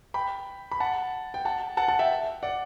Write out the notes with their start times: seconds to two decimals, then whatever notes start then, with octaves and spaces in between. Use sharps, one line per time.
0.14 G5 B5
0.71 B5
0.80 F#5 A5
1.34 G5
1.45 F#5 A5
1.77 F#5 A5
1.88 F#5 A5
1.99 E5 G5
2.43 D5 F#5